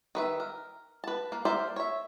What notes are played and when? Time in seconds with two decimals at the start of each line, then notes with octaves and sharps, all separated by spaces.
0.15 D#3 B4 E5
0.40 A#4
1.04 B4 A5
1.32 A#3
1.45 A#3 C5 D5 E5
1.76 C#5 E5